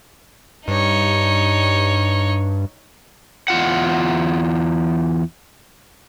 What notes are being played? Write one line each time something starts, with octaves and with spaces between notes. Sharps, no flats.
G2 D#4 C#5
E2 F4 F#5